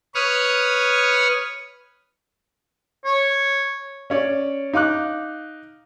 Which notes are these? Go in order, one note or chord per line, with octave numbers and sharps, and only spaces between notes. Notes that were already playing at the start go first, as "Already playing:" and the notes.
B4 C#5 C#6 D#6 F6
C#5
C#4 C#5 D5
D#4 F5 D6 F#6